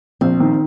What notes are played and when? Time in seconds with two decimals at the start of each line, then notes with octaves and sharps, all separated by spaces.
0.21 A#1 C4
0.40 D#3